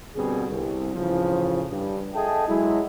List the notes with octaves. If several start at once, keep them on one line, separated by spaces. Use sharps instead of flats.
B2 D3 G3 C4 G#4
C2
D2 A2 C#3 E3 F3
G2
G#4 A4 D#5 E5 G5 A5
F#3 G#3 E4